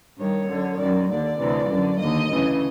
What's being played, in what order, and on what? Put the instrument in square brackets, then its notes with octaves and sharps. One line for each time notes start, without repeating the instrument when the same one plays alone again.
[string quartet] G2 D#3 C#5
F#2 D3
F#2 D#3 D5
D#2 D3 D5
D2 C3 E3
F#2 D3
D#2 D3 D#5
D2 C#3 E3